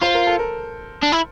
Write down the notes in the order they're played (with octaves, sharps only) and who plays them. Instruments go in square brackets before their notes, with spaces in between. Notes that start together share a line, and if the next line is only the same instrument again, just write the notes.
[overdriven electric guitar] F4 [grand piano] C5
[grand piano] A#4
A4
A#4
[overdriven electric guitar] D4
E4